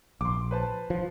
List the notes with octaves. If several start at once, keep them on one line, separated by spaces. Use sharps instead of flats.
A#1 C6 D6
B4 C5 A5
F3